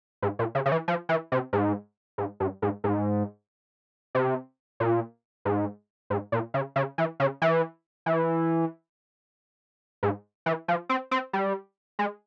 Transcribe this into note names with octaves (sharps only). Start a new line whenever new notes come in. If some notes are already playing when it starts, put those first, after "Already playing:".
G#2
A#2
C#3
C#3
E3
F3
E3
C3
G#2
G#2
G2
G#2
G#2
C3
A#2
G#2
G#2
A#2
C#3
C#3
E3
C#3
E3
E3
G#2
E3
F3
C4
C4
G3
G#3